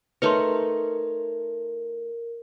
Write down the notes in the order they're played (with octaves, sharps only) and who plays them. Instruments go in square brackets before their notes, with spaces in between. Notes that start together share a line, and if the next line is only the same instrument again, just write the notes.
[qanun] A3 D#4 C#5 [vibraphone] A#4 [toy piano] B4 C6